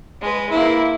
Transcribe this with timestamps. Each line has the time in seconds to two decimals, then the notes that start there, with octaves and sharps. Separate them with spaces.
0.21 G#3 B4
0.51 A#3 E4